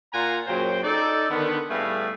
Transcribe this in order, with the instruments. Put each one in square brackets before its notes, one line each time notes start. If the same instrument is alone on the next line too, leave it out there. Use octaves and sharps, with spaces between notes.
[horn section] A#2 F4 F#5 G#5 A#5
F#2 A#2 C#3 F#3 C5 G5
D#4 A4 D5
D3 D#3 B3
A2 G3 A3 B3 G#4 F5